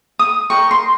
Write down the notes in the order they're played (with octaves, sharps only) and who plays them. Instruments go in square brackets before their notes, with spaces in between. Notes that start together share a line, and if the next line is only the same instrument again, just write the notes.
[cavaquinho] D#6
G4 A#4 D#5 C#6
C6